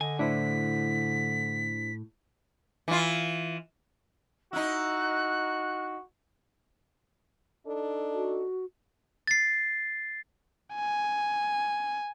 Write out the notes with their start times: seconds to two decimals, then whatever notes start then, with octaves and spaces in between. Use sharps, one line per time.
0.01 D3 D#5 G#5
0.19 A2 D4 E4 C5 B6
2.88 E3 F4
4.53 D#4 E4 F#4 F#6
7.67 D4 D#4 A4
8.13 F#4
9.27 A6 C7
10.75 G#5